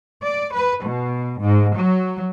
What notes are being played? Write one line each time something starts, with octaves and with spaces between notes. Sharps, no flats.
D5
B4
B2
G#2
F#3